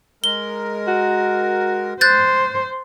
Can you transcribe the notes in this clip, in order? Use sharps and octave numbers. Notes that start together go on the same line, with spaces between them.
G#3 A#4 G7
F#4
C5 F#6 G6 A6